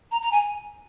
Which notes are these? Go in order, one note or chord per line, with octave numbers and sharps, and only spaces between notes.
A#5
A#5
G#5